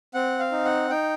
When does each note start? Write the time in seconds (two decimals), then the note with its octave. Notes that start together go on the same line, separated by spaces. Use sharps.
0.14 C4 F#5
0.39 F5
0.52 D#4
0.65 F#5
0.90 D#4 G5